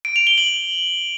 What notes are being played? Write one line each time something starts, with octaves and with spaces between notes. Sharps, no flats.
D7
F7
G7
F#7